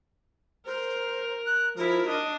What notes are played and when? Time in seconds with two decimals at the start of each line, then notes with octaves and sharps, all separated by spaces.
0.66 A#4 C5
1.46 F#6
1.76 F3 E4 A#4
2.07 D4 D#5